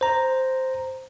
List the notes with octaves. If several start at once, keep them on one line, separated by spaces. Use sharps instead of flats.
C5 A#5